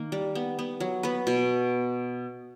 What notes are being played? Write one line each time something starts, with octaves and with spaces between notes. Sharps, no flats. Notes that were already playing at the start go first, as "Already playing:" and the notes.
Already playing: D#3 A#3
G3
B3
B3
F#3
B3 B4
B2